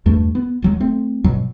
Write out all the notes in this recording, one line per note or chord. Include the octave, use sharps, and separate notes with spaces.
E2 G2 A3
B3
D#1 F#3 G#3
A3 C4
G2 B2 F#3